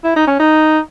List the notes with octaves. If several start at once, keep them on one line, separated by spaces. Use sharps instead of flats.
E4
D#4
C#4
D#4